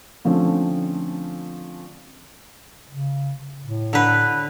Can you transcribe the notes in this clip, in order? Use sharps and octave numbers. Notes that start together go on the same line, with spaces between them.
D3 F3 A3 C4 C#4
C#3
A2
D3 B4